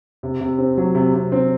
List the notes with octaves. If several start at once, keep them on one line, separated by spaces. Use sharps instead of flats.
C3
C3
C4
F#3
C3
C3
C4